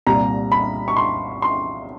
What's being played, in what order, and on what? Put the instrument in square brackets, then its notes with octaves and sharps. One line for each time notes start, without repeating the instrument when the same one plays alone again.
[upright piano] C2 A#2 G3 A#5
B5
C#6
C6
C6